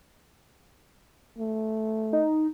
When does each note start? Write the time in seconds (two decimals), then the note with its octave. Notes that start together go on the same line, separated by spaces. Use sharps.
1.38 A3
2.13 D#4